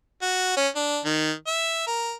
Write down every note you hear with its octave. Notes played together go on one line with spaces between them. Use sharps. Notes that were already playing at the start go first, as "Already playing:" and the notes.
F#4
C#4
D4
D#3
E5
A#4